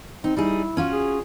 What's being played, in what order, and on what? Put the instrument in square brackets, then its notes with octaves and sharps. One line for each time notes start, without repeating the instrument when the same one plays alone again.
[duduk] C4 [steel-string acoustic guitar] D#4
[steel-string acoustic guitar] G3 D#4 G#4 [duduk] E4
[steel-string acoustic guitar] C#4 F4 F#4
[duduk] G#4